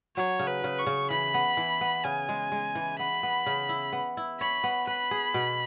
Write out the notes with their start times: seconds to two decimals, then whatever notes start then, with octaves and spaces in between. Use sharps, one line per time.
0.17 F#3 C#5
0.39 C#3
0.48 B4
0.64 C#3
0.79 C#6
0.87 C#3
1.10 E3 B5
1.34 B3
1.57 E3
1.81 B3
2.05 C#3 G#5
2.29 G#3
2.52 G#3
2.75 E3
2.99 B3 B5
3.23 B3
3.46 C#3
3.69 E4
3.93 B3
4.17 E4
4.40 C#5 B5
4.64 B3
4.87 B4 B5
5.11 G#4
5.34 B2